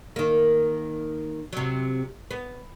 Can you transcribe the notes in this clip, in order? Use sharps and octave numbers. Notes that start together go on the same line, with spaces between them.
D#3 A#3
C3 F#3
B3